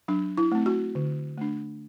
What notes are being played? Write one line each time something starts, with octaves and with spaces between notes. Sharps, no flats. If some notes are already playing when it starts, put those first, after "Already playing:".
F#3 D4
E4
A3 C4
F#4
D3
A3 D4